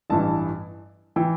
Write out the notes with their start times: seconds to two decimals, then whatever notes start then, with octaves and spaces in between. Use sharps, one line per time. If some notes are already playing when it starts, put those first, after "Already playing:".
0.10 A1 G2 E3 A5
1.16 E3 G5